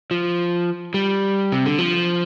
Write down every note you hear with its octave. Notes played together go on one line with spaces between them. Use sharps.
F3
G3
C3
D3
F3